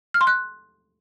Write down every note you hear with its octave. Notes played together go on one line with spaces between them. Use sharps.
F6
C6
F#6